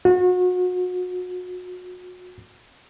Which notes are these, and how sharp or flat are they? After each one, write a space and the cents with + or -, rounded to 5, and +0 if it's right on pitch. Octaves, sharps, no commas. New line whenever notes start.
F#4 -35